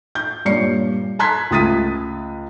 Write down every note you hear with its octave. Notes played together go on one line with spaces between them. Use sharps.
G6
G2 A#2 C#5 D5 C7 C#7
A5 A#5 C6 F#6 G#6 B6
C#2 A3 D#6 A6 B6 D#7